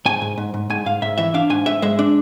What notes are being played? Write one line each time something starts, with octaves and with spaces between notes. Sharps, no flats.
G#2 G#5
G#2
G#2
G#2
G#2 G#5
G#2 F5
G#2 E5
E3 E5
D4 F5
G#2 G#5
G#2 E5
G#3 E5
D4